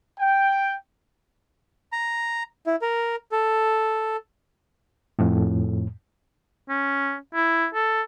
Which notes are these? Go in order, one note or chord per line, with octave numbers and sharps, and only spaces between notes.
G5
A#5
E4
A#4
A4
F2 A2
C#4
E4
A4